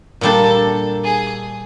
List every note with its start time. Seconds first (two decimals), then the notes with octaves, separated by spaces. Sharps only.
0.21 A#2 G3 A#3 D4 G4 A4
1.04 G#4